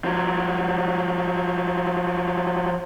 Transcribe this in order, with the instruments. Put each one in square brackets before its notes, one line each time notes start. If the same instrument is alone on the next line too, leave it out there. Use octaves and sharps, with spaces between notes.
[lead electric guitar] F3 F#3